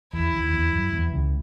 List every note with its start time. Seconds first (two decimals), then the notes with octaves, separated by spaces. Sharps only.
0.13 E2 E3 E4
0.33 D#2 D#3
0.53 E2 E3
0.73 F#2 F#3
0.92 E2 E3
1.12 C#2 C#3